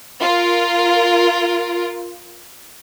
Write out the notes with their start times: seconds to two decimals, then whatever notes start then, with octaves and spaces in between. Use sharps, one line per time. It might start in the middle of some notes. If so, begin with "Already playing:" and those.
0.21 F4 A#4